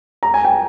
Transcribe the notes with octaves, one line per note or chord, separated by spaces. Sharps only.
A#5
G#5
G5